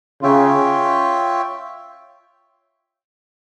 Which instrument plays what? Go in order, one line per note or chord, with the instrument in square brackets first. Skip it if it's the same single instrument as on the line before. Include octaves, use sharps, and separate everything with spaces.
[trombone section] C#3 [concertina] F4 C#5 E5 G5